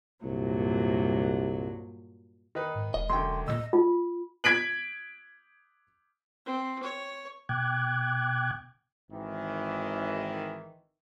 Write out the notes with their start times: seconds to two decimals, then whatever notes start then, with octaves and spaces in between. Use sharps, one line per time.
0.24 C2 G2 A#2 F#3
2.55 D#3 D#4 B4
2.75 G#2
2.94 E1 D#5
3.10 F#2 D3 G5 C6
3.48 C2 A#2 D#5 E6
3.73 F4
4.44 G#6 B6 D7 F#7
6.46 C4
6.83 C#5
7.49 B2 G5 D6 F#6 G#6
9.11 G#1 D#3 E3